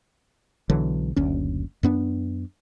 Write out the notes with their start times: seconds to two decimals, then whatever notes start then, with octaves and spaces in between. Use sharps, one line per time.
0.70 B1 D3 E3 F#3
1.16 F#1 D2 C#4
1.83 F#2 B3 D4